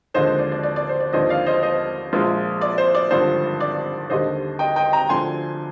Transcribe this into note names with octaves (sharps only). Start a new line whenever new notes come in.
D#2 D3 F3 G#3 C5 D#5
C5
D5
D5
D5
D5
C5
D5
D#2 D3 F3 C5 D#5
D5 F5
C5 D#5
C5 D#5
A#1 A#2 F3 G#3
D5
C5
D5
G#1 G2 D3 F3 C5
D5
D#2 D3 G3 C5 D#5
D#5 G5
D#5 G5
G5 A#5
D2 D3 F3 G#5 C6